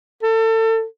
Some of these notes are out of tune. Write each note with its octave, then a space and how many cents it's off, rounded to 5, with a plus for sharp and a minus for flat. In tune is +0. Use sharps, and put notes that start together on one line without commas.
A4 +30